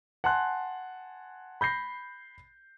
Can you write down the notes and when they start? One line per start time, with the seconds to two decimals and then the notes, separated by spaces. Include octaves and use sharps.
0.24 F#5 G#5 A5 C6 F#6
1.61 B5 G6 A#6 C7